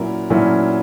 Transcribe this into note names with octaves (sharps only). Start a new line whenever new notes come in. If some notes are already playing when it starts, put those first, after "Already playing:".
Already playing: A#2 F#3 C#4 E4 A#4
A#2 F#3 C#4 E4 A#4